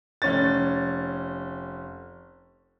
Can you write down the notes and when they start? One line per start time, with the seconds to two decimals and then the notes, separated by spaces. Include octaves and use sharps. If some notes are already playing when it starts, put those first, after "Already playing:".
0.22 F1 C#4 A6